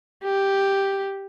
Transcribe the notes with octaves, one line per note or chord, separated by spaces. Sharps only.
G4